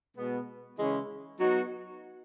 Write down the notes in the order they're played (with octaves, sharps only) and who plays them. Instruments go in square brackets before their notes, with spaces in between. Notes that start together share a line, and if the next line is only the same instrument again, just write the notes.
[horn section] B2 G#3 B3
C#3 E3 G#3 C#4 E4
F#3 B3 D#4 F#4